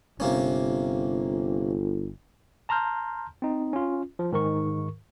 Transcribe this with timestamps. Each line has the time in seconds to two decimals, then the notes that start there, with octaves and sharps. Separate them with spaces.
0.20 G1 C3 A#3 C#4
2.69 A5 A#5 C6 F6 G6
3.42 C4 D#4
3.73 C#4 F4
4.19 F3
4.32 G#2 D#3 A#4 C#6